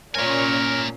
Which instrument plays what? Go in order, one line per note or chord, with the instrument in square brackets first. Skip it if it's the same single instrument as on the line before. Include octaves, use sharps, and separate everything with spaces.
[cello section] A#2 C#4 [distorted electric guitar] A#3 G#5 [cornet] A#4 [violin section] C#5 D5